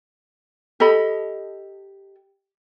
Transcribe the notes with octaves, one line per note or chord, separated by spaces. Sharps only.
G4 A4 D#5 B5